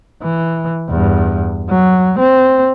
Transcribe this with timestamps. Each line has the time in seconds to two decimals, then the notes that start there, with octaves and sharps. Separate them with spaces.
0.22 E3
0.89 E2 G2
1.70 F#3
2.19 C4